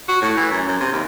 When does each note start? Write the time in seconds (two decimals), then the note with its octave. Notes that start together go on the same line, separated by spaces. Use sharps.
0.09 F#4
0.22 A2
0.37 E3
0.51 F#2
0.68 F#2
0.81 C3
0.93 D#2